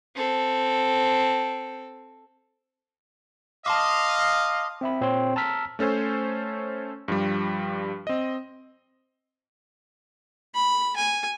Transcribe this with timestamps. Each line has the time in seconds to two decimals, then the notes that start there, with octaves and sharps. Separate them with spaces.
0.15 C4 A4
3.66 D#5 F5 A5 C6 D6
4.81 C4 E5 B5
5.01 A#2 C4 C#5 C6
5.36 A5 A#5 E6 F6 B6
5.79 A3 C#4 A4 C5 G#5
7.08 G2 F3 G3
8.07 C4 D#5
10.55 B5
10.96 G#5